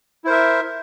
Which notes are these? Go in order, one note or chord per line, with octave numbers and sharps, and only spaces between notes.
E4 A#4 C5 E5